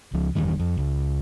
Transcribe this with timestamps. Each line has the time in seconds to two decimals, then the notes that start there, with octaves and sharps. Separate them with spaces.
0.13 C#2 F3
0.35 G1 E2 G2 D#3
0.59 F2
0.77 C#2